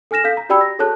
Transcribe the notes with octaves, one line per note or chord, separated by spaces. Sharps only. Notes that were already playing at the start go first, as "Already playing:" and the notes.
A4 G#5 F6 A#6 E7
A4 F5 G6 B6
A#5
F#4 G4 D5 G5 B5 E6
A#6
F#4 G#4 A4 C#5 A5 F#6